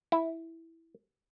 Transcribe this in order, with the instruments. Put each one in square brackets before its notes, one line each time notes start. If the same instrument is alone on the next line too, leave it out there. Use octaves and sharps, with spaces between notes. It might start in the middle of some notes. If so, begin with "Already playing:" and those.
[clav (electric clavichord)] E4